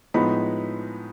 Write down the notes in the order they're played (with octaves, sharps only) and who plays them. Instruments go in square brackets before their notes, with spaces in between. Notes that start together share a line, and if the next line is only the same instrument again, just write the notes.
[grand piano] A2 F3 G#3 B3 D#4 B5